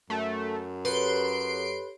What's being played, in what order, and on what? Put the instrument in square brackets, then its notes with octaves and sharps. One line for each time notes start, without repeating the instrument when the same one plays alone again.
[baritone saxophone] F#2 [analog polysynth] A3
[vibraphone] G4 A4 C#5 [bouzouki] B4 [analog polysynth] C6 D7